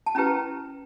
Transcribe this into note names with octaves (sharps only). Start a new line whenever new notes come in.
A5
C#4 E4 G4 B4 A#5